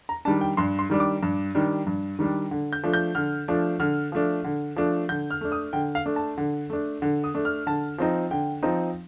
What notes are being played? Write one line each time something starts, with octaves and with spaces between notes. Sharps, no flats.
A#5
D#3 G3 D4 A5
G5
G2 C6
C6
D#3 G3 D4
D6
G2
D#3 G3 D4
G2
D#3 G3 D4
D3
G6
F3 A3 D4
G6
D3 F6
F3 A3 D4
D3 F6
F3 A3 D4
D3
F3 A3 D4
D3 G6
F6
A3 D4
D#6
D3 G5
F5
A3 D4
A5
D3
A3 D4
D3
D#6
A3 D4
F6
D3 A5
F3 C4 D#4
D3 G5
F3 C4 D#4